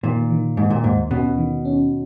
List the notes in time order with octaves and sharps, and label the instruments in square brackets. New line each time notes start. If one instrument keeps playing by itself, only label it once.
[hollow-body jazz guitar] A#2 [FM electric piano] D#3
[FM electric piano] D#3
[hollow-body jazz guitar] G#2 [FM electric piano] D#3
[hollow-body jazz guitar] A#2
[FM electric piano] D#2 [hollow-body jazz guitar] G#2
[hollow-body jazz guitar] B2 [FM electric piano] C#4
[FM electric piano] D#3
C#4